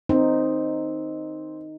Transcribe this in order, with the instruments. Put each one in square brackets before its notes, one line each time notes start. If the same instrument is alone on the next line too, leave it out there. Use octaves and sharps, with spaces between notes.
[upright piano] C4 [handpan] D#4